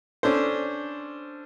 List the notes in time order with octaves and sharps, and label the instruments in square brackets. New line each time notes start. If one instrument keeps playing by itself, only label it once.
[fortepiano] C#4 D4 A4 C5